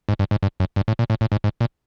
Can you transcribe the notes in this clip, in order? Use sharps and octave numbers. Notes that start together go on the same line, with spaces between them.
G#2
G2
G#2
G2
F#2
G2
A2
A#2
A2
A2
G#2
G#2
A#2